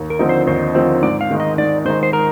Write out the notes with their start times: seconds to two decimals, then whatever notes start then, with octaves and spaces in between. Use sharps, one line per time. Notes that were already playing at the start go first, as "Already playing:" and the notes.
Already playing: D#2
0.10 A#4
0.19 D3 F3 C4 D#4
0.29 C5
0.47 D#2 C5
0.75 D3 F3 C4 D#4
1.03 G#2 D5
1.21 F5
1.31 D#3 G#3 D#4
1.40 D#5
1.58 G#2 D5
1.85 D#3 G#3 D#4 C5
2.03 C5
2.13 A#4